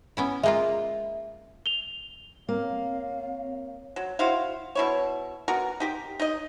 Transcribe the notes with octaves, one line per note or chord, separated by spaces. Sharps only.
B3 C#4 E4
G#3 A#3 F4 E5
F7 G7
A#3 C4 C#5 F5
F#3
E4 F#4 C5 F5
B2 E4 C#5
B3 F#4 A#4
D#4 G4 A#4
D#4 D#5